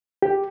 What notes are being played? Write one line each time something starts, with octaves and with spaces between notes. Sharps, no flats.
G4